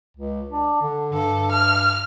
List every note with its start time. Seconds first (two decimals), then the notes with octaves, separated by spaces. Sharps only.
0.17 C#2
0.51 D4
0.82 D3
1.13 G2 A4
1.52 F6